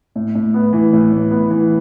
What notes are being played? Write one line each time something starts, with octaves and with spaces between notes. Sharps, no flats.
A2
A2
B3
E3
A2
A2
B3
E3